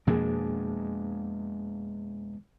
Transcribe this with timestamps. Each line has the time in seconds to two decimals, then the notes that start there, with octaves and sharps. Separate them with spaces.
0.07 F2 B2 G#3 A#3 D4 G#4